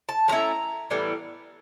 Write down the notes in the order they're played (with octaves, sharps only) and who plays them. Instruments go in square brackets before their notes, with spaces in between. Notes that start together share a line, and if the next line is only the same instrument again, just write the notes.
[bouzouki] A5
F3 A3 C#4 E4 A#5
A2 E3 G3 B3